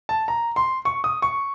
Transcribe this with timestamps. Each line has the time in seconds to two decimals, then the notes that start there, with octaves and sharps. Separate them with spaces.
0.09 A5
0.28 A#5
0.56 C6
0.85 C#6
1.04 D#6
1.22 C#6